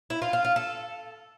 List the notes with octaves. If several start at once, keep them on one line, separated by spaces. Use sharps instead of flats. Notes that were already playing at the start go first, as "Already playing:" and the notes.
E4
F4
F4
F4
A4